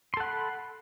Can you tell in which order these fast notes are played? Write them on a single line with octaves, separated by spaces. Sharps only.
C6 A4 F#5 B5